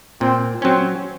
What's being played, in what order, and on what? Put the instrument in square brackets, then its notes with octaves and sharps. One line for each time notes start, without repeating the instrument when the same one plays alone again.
[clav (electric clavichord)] A#2 [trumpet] C4
[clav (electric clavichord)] F#3 C#4 [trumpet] C4